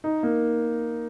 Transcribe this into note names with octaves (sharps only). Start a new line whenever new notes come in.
D#4
A#3